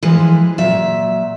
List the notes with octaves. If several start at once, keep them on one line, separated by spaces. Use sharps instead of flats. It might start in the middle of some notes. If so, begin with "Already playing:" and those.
E3 F3 G#3 B4
A#2 F#3 E5